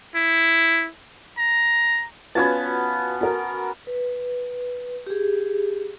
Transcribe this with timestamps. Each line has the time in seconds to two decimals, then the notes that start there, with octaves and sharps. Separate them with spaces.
0.15 E4
1.38 A#5
2.35 B3 C#4 F4 F#4 B4 A5
3.21 F#4 A#4
3.87 B4
5.07 G4 G#4